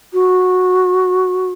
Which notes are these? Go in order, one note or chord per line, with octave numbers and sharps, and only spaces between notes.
F#4